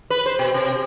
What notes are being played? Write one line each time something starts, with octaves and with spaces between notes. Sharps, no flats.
B4
C5
B2
C3